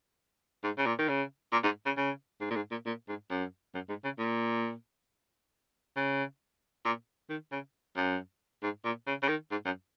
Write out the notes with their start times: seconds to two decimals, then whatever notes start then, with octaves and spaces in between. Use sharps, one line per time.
0.64 G#2
0.78 C#3
0.86 A#2
0.99 D#3
1.09 C#3
1.52 A#2
1.64 G#2
1.86 C#3
1.97 C#3
2.41 G#2
2.51 A#2
2.56 G#2
2.71 A#2
2.86 A#2
3.08 G#2
3.30 F#2
3.74 F#2
3.89 G#2
4.04 C#3
4.19 A#2
5.96 C#3
6.85 A#2
7.29 D#3
7.52 C#3
7.96 F#2
8.62 G#2
8.85 A#2
9.07 C#3
9.23 C#3
9.29 D#3
9.51 G#2
9.65 F#2